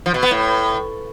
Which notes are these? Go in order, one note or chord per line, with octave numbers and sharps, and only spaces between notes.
F3
B2
B3
A2